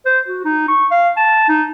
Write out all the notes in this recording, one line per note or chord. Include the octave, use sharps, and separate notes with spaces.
C5
F#4
D#4
C#6
F5
A5
D#4